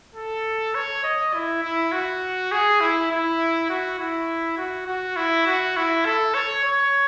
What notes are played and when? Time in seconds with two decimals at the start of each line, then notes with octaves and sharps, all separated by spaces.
0.15 A4
0.75 C#5
1.04 D#5
1.34 E4
1.63 E4
1.92 F#4
2.52 G#4
2.81 E4
3.11 E4
3.70 F#4
3.99 E4
4.58 F#4
4.87 F#4
5.17 E4
5.47 F#4
5.76 E4
6.06 A4
6.34 C#5
6.64 C#5